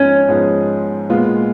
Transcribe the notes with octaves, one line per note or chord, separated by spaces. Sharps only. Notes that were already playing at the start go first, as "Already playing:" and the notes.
Already playing: G#2 F3 B3 C#4 D#4
G#2 F3 B3 D#4 G#4
A#2 G#3 B3 F4